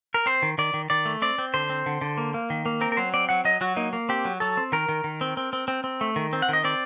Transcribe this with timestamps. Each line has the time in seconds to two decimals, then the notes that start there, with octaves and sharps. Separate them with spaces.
0.14 A#4
0.26 C4 C5
0.42 D#3
0.58 D#3 D5
0.74 D#3
0.90 D#3 D5
1.05 A3
1.22 C4 D5
1.38 C4
1.54 D3 C5
1.70 C4
1.86 D3
2.01 D3
2.18 A#3
2.34 A#3
2.50 D#3
2.66 A#3
2.81 C4 A#4
2.92 A#4
2.97 F#3 C5
3.14 C4 D5
3.29 F#3 F#5
3.45 F#3 D#5
3.61 F#3 F#4
3.76 A#3 D#4
3.93 A#3
4.09 C4 G4
4.25 F#3
4.40 F#3 A4
4.57 C4
4.72 D#3 A#4
4.89 D#3
5.04 D#3
5.21 C4
5.37 C4
5.53 C4
5.68 C4
5.84 C4
6.01 A3
6.16 D#3
6.33 C4
6.42 F#5
6.49 D#3 D#5
6.64 C4 D5